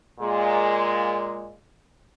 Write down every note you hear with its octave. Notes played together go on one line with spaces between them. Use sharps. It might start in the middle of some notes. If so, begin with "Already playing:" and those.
A#2 G#3